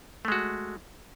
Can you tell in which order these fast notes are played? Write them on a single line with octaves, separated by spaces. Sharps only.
A3 G#3 F#4